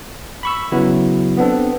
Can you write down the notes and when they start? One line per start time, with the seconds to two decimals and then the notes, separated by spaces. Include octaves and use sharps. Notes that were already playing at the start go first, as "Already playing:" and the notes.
0.43 B5 C#6 E6
0.72 C#3 F#3 B3 E4
1.37 B3 C4 D4 A4